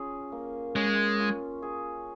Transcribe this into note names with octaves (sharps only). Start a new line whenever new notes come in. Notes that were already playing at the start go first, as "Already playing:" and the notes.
Already playing: C#4 F4 G#4
A#3
G#3 C#4
F4
G#4